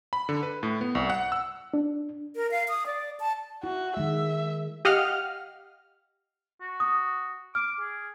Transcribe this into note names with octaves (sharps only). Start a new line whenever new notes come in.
B5
D3
B4
A2
B3
C2
F#5
E6
D4
A#4
F5
D#6
D5
A5
E4 F#4
D#3 G#3 E5
G4 D#5 F5 F#5 F6
F#4
D#6
D6 F6
G#4